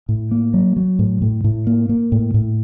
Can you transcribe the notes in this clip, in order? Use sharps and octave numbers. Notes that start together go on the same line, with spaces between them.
A2
A#3
F#3
F#3
A2
A2
A2
A#3
A#3
A2
A2